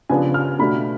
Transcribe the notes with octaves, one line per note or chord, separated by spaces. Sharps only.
C#3 F3 B3 D4 G#5
F6
B2 A3 D4 B5